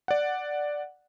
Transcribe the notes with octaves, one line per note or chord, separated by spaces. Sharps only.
D5 F#5